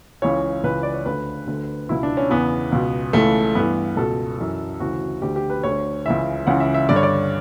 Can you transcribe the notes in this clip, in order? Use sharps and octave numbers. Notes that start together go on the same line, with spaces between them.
C#2 C#3 E3 C#5
C#2 C#3 E3 B4
D5
C#5
D2 D3 B4
D2 D3
C#2 B2 E4
D4
C#4
E2 C#3 E3 B3
C#2 B2
C#2 C#3 E3 A3
G2 E3 B3
C#2 B2 A4
F#2 E3
D2 C#3 E3 F#4
D2 D3 G4
G4
B4
D2 D3 C#5
C#2 C#3 E3 E5
C#2 C#3 E3 F#5
E5
E5
G2 D3 D5
C#5
D5